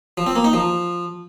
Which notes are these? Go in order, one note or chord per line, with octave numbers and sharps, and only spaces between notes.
F3
C4
A#3
D#4
F3